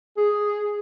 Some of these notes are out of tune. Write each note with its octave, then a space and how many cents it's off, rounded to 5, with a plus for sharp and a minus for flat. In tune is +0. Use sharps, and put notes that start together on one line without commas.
G#4 +0